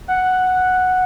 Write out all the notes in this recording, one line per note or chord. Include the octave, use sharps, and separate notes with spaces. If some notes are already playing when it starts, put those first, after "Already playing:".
F#5